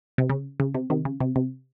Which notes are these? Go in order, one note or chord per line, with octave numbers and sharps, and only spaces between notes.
C3
C#3
C#3
C3
C3 D#3
C#3
C3
C3